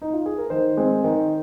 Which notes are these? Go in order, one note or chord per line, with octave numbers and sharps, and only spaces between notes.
D#4
F4
G#4
A#4
D#3 C5
G#3 C4
D#3